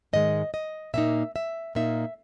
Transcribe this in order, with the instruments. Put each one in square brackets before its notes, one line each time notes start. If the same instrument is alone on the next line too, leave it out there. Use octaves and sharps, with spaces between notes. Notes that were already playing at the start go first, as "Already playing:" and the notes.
[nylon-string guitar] G#2 D#3 G#3 D#5
D#5
A#2 A#3 D#4 E5
E5
A#2 A#3 D#4 E5